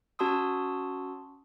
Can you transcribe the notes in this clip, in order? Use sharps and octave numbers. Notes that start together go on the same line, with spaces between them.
C#4 F#4 A5 C6 D#6 E6